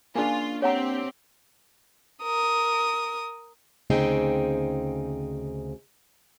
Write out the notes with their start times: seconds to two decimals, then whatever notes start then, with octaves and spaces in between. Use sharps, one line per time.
0.16 A#3 C#4 D4 F4 G#4 G#5
0.62 C4 G4 C#5 F#5 A#5
2.23 A#4 D#6
3.90 D2 C#3 C4 D#4 G#4 G5